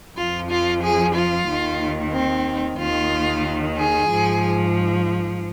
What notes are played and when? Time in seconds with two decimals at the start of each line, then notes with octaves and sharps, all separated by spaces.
0.17 F2 F3 F4
0.50 F4
0.82 G#4
1.15 F4
1.48 D#2 D#3
2.13 C4
2.79 D#2 D#3 F4
3.77 G#4
4.10 G#2 F3